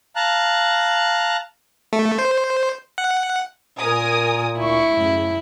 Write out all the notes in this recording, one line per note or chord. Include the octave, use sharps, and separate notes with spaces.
F5 A5 A#5 F#6
A3
C5
F#5
A#2 A#4 G#5 D#6
D2 E4 C#6
F#2 A2 C#3